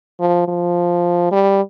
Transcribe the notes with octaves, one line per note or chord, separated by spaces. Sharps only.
F3
F3
G3